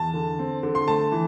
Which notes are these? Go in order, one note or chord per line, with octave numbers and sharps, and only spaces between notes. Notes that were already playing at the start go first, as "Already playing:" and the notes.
Already playing: E2 A5
D3
C4
D3
C6
A3 A5
E3